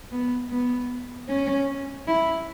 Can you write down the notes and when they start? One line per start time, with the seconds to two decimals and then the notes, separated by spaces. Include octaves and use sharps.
0.12 B3
0.51 B3
1.28 C#4
2.07 E4